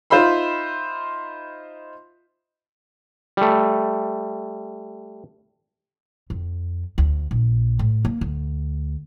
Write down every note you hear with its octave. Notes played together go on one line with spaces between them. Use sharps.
D#4 F4 C5 E5 B5 C6
G3 A3
F2
D2
A#1
A2
A#3
D2